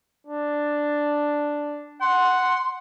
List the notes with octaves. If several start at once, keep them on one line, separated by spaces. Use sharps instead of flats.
D4
F#5 C6